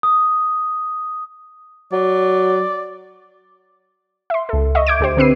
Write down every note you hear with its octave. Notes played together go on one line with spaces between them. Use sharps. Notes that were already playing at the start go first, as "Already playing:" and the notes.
D#6
F#3 D5
E5 C6
C#2 A4
D#5 E5 C#6
D6 G6 G#6 D7
D2 G4 C5
D3 C4 B4 E6 C7 D#7